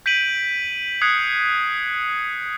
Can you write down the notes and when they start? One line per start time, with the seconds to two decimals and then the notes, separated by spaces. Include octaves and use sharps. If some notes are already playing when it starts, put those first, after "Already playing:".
0.06 G6 B6 D7 D#7 F#7
1.02 D#6 F#6 G#6 C7 C#7